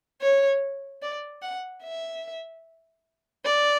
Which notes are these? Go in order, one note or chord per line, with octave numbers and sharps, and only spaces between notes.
C#5
D5
F#5
E5
D5